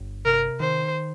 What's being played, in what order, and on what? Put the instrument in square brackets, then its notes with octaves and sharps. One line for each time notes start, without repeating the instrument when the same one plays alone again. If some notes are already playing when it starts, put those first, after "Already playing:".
Already playing: [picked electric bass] G1
[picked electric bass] C3 [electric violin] A#4
[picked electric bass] D#3 [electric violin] C5